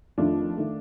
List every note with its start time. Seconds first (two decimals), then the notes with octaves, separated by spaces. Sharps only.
0.18 F2 D#3 A3 D4 F4
0.57 D#3 A3